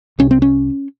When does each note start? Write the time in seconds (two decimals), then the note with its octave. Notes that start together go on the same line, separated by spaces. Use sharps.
0.19 C2 C3 C#4
0.31 C4
0.42 C#4